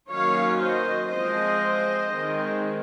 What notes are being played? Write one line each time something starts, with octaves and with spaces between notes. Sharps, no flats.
D#3 F#3 A#3 C#4 C#5 F5
C5 D#5
F3 G#3 C4 C5 D#5
D#3 G#3 C4